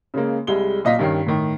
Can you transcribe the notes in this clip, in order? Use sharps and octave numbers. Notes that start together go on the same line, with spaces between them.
C#3 G#3 A#3
C2 G3 G#3 G#4 G7
B1 A#2 D#5 F5 B6
G2 D#3 C#4 C7
A2 D#3